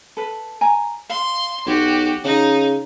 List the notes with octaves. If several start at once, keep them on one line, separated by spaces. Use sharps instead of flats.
A4 B4
G#5 A#5
F5 C6
B1 F#4 G4 C#5
C#3 D#4